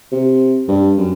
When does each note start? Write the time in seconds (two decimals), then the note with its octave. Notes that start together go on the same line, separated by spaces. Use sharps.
0.12 C3
0.68 G2
0.98 F#2